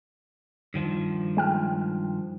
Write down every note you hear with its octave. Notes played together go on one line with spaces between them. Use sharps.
G2 D#3 F3
G#3 G5 F6